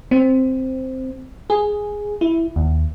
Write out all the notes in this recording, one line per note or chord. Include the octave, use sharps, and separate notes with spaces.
C4
G#4
E4
D#2